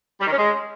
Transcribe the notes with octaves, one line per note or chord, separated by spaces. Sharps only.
G3
D#3
C#4
G#3